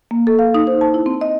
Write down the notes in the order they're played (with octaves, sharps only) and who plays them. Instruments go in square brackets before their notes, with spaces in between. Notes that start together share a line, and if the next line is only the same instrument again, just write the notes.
[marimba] A#3
A4
F5
D#4
C5
A5
E4
C4
D#5